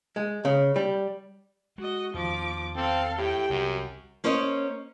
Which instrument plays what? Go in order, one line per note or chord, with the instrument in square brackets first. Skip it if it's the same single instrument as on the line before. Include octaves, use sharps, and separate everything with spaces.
[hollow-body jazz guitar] G#3
C#3
G3
[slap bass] G#3 [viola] F#4 D#5
[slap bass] E2 D#3 [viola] F3 D6
[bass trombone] C4 [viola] A4 F5
[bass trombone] A2 [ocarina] G4 [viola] G5
[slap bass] C2 [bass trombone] F#2
[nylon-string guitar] A#3 C#4 C5 C#5 D#5